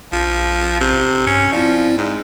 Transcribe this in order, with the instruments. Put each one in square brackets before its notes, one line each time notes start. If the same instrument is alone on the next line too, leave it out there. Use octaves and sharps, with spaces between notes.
[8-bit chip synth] A#1 [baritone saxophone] F3
[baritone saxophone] C3
[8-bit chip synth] G2 [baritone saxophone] C#4
[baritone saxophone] F3 [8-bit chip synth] C4 E4 D5
[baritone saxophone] G#2